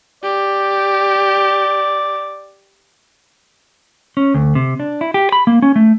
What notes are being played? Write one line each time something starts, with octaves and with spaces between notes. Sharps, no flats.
G4 D5
C#4
D2
C3
D4
E4
G4
B5
A#3
C#4
A3